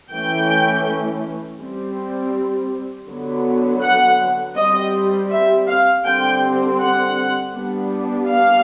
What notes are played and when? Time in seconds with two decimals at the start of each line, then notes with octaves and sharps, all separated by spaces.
0.12 E3 A3 C#4 G5
1.61 G3 C4
3.08 D3 F#3 B3
3.83 F#5
4.57 G3 C4 D#5
5.31 E5
5.68 F5
6.05 D3 G3 C4 G5
6.79 F#5
7.54 G3 B3 D4
8.28 F5